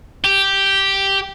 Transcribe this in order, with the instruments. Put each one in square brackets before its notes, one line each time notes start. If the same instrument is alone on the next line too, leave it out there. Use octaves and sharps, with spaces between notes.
[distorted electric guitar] G4